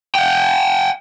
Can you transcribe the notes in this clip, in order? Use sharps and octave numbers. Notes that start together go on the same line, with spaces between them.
F#5 G5